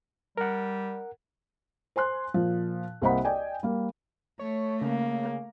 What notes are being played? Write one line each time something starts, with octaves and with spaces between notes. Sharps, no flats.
G3 A#4 F#5
C5 G#5 C6 F#6
A#2 F3
C2 A#3 C5 D#5 F#5 B5
D5 D#5 G5 G#5
G3 A#3
A3 C#5
C#3 A#3